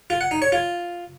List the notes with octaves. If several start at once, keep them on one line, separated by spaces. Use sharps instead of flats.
F4
F#5
D#4
C#5
F4